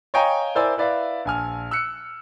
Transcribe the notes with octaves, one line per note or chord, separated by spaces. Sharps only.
C#5 D#5 F5 G5 G#5 A#5
E4 A#4 C5 D5 G#5 E6
E4 B4 D5 E5 F5
A#1 G#5 F6
E6 F#6 C#7